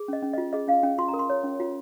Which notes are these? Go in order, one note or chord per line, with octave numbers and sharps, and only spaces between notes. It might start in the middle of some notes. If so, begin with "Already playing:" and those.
Already playing: G#4
C#4 D#5
C#4
F4 D#5
G#4 D#5
C#4 F5
C#4 G5
F4 C6
A#5
A#4
C6
C#5
C#4
F4